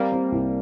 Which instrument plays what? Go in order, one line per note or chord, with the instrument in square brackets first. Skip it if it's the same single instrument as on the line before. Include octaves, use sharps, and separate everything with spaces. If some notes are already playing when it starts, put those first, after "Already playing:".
Already playing: [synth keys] G3 A#3 [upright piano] C4
[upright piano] C4
C2